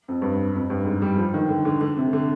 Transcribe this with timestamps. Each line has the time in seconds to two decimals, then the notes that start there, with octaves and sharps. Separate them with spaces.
0.08 F2
0.22 G2
0.54 F2
0.70 G2
0.85 G#2
1.02 G3
1.18 F3
1.34 D#3
1.49 D3
1.65 D3
1.81 D3
1.97 C3
2.13 D3